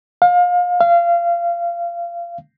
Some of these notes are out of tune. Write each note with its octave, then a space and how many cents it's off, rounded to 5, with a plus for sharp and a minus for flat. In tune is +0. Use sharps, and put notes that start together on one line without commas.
F5 +30
F5 -25